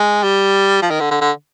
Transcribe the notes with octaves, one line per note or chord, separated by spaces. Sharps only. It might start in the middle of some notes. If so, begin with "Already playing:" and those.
Already playing: G#3
G3
F3
D#3
D3
D3
D3